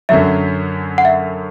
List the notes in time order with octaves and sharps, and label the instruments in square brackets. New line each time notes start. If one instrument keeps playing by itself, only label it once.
[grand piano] F#2 D3 F#3 [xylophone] E5
[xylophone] F#5
E5